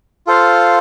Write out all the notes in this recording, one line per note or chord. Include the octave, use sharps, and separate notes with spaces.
F4 A4 C5 F5